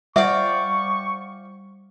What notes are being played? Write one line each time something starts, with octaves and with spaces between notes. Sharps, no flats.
G3 D5 E5 F5 G5 C#6